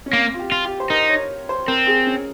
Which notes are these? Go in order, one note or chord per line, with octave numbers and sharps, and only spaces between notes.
C#4
A#3 C4
F4
G4
F4
G4
C5
D#4 A#4
C#5
C5
C4 A#4
G#4
C#4